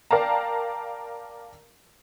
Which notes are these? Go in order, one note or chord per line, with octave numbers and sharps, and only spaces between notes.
A#4 D5 F5 G5 A5 A#5